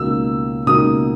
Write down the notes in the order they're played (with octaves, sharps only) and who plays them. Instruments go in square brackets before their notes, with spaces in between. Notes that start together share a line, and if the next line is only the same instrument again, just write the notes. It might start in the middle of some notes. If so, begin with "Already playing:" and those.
Already playing: [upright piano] C#2 B2 A#3 D#4 [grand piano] E6
[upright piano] C#2 B2 A#3 D#4 [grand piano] D#6